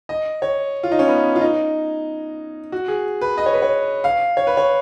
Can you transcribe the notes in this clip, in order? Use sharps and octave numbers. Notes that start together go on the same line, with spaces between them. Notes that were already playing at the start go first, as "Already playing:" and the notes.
D#5
C#5
F4
D#4
C#4
B3
F4
D#4
F#4
G#4
B4
D#5
C#5
B4
C#5
F5
C#5
B4
C#5